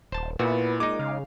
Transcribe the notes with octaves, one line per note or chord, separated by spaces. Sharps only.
D#1 C5 A5
A#2 B3 E4 F#4
A#2 G#3 D#4 D6
C#3 F5